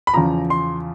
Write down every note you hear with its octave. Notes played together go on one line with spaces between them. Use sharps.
B5
E2 C#3 F3 A#5
C6